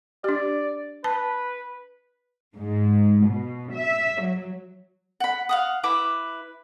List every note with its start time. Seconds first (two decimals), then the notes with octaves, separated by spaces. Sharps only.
0.24 D4 G4 D5
1.04 B4 A5
2.56 G#2
3.26 B2
3.73 E5
4.21 F#3
5.20 F#5 B5
5.49 F5 F#5 D#6
5.83 E4 B4 D6